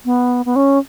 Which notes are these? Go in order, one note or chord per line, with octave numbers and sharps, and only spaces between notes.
B3
B3
C#4